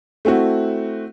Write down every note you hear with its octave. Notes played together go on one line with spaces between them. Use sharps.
A3 C4 E4 F#4